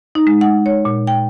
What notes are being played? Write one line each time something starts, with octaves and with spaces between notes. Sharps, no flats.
D#4
G#3
F#5
C#5
A#2
G5